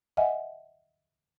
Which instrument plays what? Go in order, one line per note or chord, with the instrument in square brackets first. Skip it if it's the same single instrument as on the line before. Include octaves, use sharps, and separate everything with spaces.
[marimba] D#5 E5 F#5 G#5